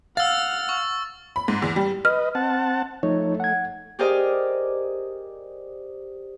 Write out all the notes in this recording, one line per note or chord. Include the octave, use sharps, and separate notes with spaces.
F5 F#5 E6 F6 A6
C#6
B5
G#2
E2
G3
B4 D#5 F6
C4 F#5 A5
F3 A3 D#4 C#5
F#5 G#6
G4 G#4 A#4 C5 D5 D#5